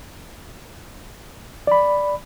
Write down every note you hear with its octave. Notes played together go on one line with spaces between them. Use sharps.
D5 B5